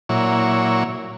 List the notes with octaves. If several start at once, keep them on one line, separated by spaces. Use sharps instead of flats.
A#2 F#3 E4 C#5